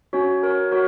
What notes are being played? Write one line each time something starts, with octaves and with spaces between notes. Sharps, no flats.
C#4 F#4 C#5
F#4 A#4 C#5
F#4 A#4 C#5